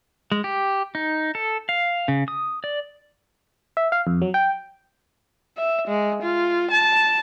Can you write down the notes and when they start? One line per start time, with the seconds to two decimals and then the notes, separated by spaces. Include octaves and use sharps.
0.32 G#3
0.44 G4
0.95 D#4
1.35 A4
1.69 F5
2.08 C#3
2.28 D#6
2.64 D5
3.77 E5
3.92 F5
4.07 F2
4.22 F#3
4.34 G5
5.57 E5
5.88 G#3
6.22 F4
6.71 A5